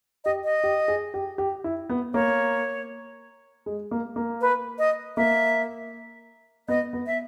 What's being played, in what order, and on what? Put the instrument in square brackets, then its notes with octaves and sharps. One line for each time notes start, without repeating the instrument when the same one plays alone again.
[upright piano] G4 [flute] D#5
[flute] D#5
[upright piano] G4
G#4
G4
G4
E4
B3
[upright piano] A#3 [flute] C#5
[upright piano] G#3
A#3
A#3
[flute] B4
D#5
[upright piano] A#3 [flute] E5
[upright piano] B3 [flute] D#5
[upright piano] B3
[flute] E5